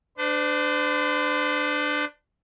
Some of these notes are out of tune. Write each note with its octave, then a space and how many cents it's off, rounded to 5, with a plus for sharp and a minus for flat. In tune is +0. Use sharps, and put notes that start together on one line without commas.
D4 +10 C5 -45